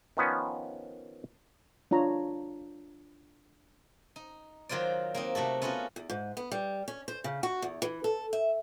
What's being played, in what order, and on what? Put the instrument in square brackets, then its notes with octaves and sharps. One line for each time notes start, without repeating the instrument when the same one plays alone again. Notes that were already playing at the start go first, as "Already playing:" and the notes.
[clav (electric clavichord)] D#3 F3 B3 C#4
[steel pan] D4 F4 C#5 A#5
[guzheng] D#4
D#3 F#3 F4 C5 D5
A#3 C4 D#4
C3 A3 F#4 A4
B3 C#4 F4 F#4 A4
[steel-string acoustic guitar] E2
G#2
B3
G3
C#4
C5
C#3
F#4
E2
E3
A4
E5